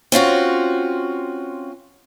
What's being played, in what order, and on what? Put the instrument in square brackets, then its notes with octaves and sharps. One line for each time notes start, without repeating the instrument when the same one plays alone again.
[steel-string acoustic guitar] C4 C#4 F4 F#4